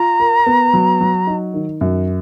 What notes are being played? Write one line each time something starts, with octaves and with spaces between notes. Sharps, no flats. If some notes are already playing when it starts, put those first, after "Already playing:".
Already playing: F4 A#5
A#4
B3
F#3
F#3
D#4
D#3
F#2